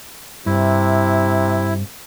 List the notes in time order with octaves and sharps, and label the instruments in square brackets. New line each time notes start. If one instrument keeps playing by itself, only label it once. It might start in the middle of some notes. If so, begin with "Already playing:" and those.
[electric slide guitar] G2 [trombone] C3 [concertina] E4